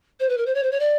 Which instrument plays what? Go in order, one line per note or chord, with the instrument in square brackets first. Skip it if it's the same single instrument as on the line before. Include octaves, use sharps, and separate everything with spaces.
[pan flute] C5
B4
A#4
C5
C#5
C5
C#5
D5